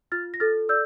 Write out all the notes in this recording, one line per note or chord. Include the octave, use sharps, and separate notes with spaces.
F4 F6 A6
A#6
A4 F6 A6
D5 E6 G6